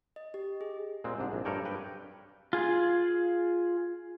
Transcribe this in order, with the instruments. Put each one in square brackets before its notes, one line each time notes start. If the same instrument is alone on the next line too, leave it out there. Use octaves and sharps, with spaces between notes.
[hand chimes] D#5
G4
G#4
[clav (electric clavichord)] A#2 G#3 C4
C2 G#2 D4
A#1
G2 A4 A#4 C#5 D5 G5
G3 B4 G5
[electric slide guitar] F4 G#4